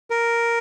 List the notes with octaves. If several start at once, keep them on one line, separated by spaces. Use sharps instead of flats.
A#4